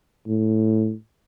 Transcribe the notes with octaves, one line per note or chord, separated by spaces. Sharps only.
A2